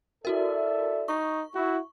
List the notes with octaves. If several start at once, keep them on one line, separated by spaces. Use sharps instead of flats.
E4 F#4 A4 A#4 D5 E5
D#4 C#6
E4 F#4